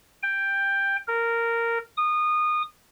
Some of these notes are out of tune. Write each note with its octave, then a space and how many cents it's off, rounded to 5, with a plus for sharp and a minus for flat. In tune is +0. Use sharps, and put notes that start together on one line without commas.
G5 +10
A#4 -10
D#6 -25